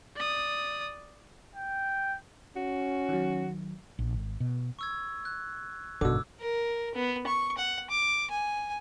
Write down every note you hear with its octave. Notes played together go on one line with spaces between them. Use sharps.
D5 D#6
G5
C#4 F#4
D#3 F#3
A#1
G#1
B2
C#6 E6 G#6
F#6
G#1 F#2 B2 D3 D6 E6
A#4
B3
C#6
F#5
D6
G#5